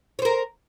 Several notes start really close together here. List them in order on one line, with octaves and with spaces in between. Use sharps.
C#5 C5 A#4